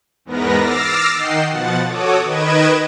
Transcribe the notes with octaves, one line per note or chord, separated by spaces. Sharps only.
E2 G#2 B3 A#4 B4 A#6
D6 E6 F6 A6 A#6 C7
D#3 D#5 F#5 G5 C7 E7
B2 F3 F#5 A6
F#4 A4 C#5 D6 D#6
D#3 B4 D#5 G#6 D7 E7